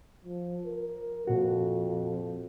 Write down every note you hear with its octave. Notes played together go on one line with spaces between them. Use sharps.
F3
A#4
F2 A#2 F#4